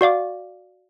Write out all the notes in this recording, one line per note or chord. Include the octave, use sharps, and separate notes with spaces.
F#4 D5 F5 D6